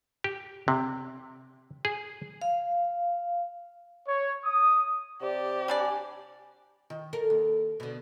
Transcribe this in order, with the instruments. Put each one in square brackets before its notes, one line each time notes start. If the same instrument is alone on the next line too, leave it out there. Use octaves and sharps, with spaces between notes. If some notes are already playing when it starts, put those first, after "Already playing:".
[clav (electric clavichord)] G4
C3
G#4
[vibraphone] F5
[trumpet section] C#5
D#6
[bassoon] C3 [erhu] G4 [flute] D5
[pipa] G3 D4 D5 [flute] G#5
[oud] D#3
A4 A#4
D#2
B2 D3